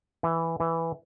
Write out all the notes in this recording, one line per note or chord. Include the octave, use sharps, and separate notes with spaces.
E3
E3